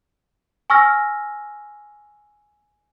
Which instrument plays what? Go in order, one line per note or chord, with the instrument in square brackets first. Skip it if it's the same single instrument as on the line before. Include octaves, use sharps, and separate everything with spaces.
[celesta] G#5 C#6 E6 F6 A#6